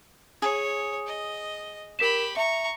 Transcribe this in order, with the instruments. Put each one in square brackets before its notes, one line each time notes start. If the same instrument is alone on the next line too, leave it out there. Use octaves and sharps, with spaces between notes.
[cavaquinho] G#4 [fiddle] C#5
[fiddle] D#5
[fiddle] G4 B5 [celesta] A#4 B6 E7
[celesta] E5 [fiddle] A#5 C#6